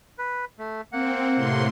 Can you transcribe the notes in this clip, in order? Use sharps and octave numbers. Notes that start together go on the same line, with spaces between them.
B4
A3
A#3 C4 F#5
A2 C3 C6